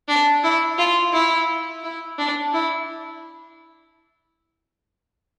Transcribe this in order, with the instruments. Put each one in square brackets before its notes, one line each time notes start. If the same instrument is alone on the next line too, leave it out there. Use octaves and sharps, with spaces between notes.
[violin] D4
E4
F4
E4
E4
D4
E4